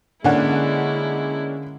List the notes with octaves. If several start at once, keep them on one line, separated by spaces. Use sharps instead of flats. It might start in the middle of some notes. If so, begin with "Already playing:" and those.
D3 G#3 A#3 C#4 D4 E4 F#5